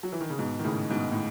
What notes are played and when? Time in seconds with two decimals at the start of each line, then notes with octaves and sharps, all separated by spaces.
0.03 F#3
0.13 E3
0.21 D#3
0.30 C#3
0.39 G#2 B2
0.59 D#3
0.65 A2 C#3
0.90 G#2 B2
1.12 A2